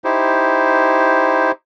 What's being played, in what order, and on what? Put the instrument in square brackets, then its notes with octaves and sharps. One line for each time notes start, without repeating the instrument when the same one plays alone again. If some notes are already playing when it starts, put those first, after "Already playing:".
[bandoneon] D#4 E4 G4 C5